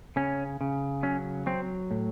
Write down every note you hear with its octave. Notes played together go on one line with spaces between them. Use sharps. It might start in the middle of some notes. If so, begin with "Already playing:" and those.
C#3 C#4
C#3
F#3 C#4
F#3 C4
A2